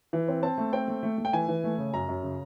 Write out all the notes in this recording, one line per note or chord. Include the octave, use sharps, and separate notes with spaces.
E3
C4
C4 A5
A3
C4 G5
A3
A3
A3
G5
E3 G#5
E3
A3
C#3
F#2 A#5
F#2
C#3